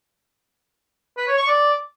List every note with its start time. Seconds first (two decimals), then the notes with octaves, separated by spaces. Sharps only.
1.17 B4
1.27 C#5
1.38 C#6
1.48 D5